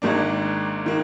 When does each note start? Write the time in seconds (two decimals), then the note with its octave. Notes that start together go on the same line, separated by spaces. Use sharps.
0.02 G#1 G#2 D#3 A#3 D4
0.86 D#3 A#3